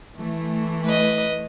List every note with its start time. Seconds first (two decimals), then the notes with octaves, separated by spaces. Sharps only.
0.16 E3 A3
0.86 B4 D#5